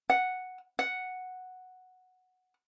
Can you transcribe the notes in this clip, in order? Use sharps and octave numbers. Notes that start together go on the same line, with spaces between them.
F#5
F#5